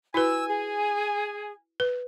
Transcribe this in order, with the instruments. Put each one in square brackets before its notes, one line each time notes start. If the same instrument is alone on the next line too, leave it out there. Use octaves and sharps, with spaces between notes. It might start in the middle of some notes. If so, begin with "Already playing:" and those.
[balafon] E4 F#4 B4 [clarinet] G#5 [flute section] E6
[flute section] G#4
[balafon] B4